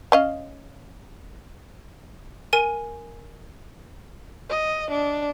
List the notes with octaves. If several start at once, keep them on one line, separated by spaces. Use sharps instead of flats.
C#4 D#5 F5
A#4 G#5 D#7
D#5
D4